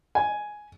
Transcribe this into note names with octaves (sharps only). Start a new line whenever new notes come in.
G#5